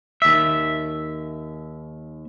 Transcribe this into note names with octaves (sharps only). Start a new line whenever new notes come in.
D#2 E5